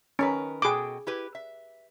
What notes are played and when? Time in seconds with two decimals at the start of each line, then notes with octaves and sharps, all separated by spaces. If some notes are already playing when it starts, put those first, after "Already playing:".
0.19 D#3 C#4 A#4 B4
0.62 B2 G#4 A4 G5 D6
1.07 E4 G4 B4
1.35 E5